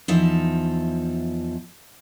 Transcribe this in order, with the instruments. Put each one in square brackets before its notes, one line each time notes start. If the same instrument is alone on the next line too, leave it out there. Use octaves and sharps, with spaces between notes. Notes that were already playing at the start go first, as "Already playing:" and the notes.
[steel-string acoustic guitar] E2 F3 D#4 E5